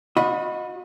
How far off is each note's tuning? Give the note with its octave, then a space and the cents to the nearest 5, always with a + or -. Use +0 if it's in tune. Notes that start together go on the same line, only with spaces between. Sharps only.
F#4 -40 D#5 +0 B5 +0